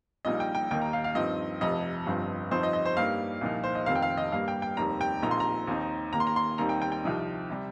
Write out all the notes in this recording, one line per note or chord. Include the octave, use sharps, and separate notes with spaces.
A#1 A#2 G3 A#3 D#4 D#5
G5
G5
D#2 D#3 A#3 D#4 G5
A#5
F5
F5
G2 F3 C4 D#4 D#5
F1 F2 C3 D#5
G1 G2 F3 C4
G1 F2 F3 C4 D#4 C5
D#5
D#5
C5
G2 G3 A#3 D#4 F5
C2 A#2 F3 D#4
C5
D#5
F1 F2 D#3 C4 F5
G5
F5
D#5
G2 G3 A#3 F5
G5
G5
F1 D#2 D#3 G3 C4 A#5
G5
A#1 A#2 F3 C4 D#4 A#5
C6
A#5
D#2 D#3 C4 D#4
D#2 D#3 A#3 A#5
C6
A#5
C6
D#2 D#3 G3 C4 D#4 A#5
G5
G5
G5
C2 C3 F3 D#4
C3 G3